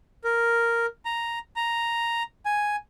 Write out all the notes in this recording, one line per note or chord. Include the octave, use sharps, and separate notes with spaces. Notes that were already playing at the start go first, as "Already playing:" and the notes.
A#4
A#5
A#5
G#5